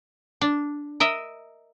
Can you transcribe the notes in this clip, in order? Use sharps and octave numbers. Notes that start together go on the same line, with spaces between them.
D4
A#4 D#5 E5